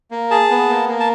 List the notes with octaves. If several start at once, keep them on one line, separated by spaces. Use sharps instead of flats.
A#3
G#4 A5
B3
A#3
A#3
A5